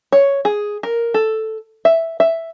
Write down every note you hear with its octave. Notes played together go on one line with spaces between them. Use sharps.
C#5
G#4
A#4
A4
E5
E5